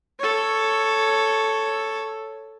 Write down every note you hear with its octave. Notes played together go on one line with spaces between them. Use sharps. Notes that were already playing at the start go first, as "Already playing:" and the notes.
A4 C#5